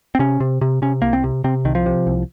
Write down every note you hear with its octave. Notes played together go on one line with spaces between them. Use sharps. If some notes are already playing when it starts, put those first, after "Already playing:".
C4
C3 C#4
C3
C3
C3 C#4
C2 A#3
C4
C3
C3 C4
C2 D#3
F3
C3
C2